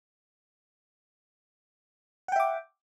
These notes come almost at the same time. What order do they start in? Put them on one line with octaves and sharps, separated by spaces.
F#5 G5 E5 D6